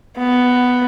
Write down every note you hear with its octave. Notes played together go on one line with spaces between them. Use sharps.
B3